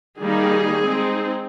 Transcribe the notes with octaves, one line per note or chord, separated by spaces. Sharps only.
D#3 G3 A#3 D#4 G#4
G#3 C4 D#4